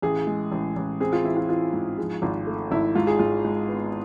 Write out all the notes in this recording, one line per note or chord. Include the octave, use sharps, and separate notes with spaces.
A1 G#4
G#3
A1
A1
C4 G#4
F4
E3 E4
F4
E3 F4
G#2
F3 G#4
G#1 F4
A3
G#1 E4
G#2 F4
G#4
G#2 F4
G#3
B3